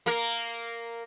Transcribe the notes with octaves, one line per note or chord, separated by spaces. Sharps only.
A#3 A#4